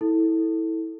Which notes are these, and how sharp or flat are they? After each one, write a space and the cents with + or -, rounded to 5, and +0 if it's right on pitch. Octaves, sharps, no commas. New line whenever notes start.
E4 -25 A4 +0